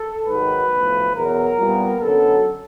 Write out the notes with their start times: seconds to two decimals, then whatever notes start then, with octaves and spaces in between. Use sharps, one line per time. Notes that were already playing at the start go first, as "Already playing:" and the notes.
Already playing: A4
0.26 G#2 D#3 F#3 B4
0.70 B1 A2 F3
1.14 E2 B2 F#3 A#4
1.57 C2 A#2 G3 B3
2.01 F#2 D3 F#3 B3 A4